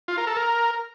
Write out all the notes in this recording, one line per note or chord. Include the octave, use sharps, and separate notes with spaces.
F4
A#4
A4
A#4